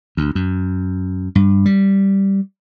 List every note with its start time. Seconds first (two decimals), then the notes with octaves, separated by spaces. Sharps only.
0.17 D2
0.35 F#2
1.35 G2
1.66 G3